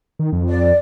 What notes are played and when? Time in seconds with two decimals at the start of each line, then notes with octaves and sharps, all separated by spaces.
0.19 D#3
0.33 F2
0.48 D5